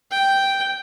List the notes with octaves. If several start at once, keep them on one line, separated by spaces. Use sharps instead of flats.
G5